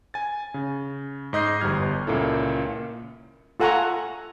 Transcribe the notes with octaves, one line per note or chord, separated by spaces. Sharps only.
G#5 A6
C#3
G#2 D#5 G6 C7
G1 E2 G3 F6 G#6
C#2 A#2 A#3 C#4 E4 A4
F4 A4 F#5 G#5 A#5 C#6